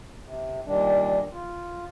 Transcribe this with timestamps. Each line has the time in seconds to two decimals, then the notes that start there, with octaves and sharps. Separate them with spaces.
0.24 C3
0.66 A#2 D#3 G3 D4
1.32 F4